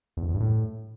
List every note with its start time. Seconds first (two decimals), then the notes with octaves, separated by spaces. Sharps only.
0.17 E2
0.23 F2
0.29 E2
0.35 G2
0.40 A2